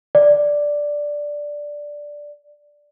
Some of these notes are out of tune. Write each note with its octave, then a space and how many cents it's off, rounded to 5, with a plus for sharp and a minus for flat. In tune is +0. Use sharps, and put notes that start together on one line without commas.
D5 +0